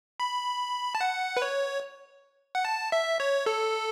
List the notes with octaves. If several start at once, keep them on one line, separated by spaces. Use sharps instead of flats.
B5
A5
F#5
B4
C#5
F#5
A5
E5
C#5
A4